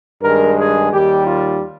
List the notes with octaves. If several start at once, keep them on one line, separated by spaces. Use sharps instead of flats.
G2 D#3 G#3 A#4
G#4
D#2 D#3 G3 G4
F4